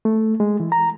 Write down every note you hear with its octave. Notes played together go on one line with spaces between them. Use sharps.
A3
G#3
E3
A#5